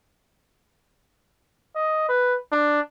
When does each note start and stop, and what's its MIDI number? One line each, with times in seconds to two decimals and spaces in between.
1.75 2.04 75
2.08 2.36 71
2.52 2.80 62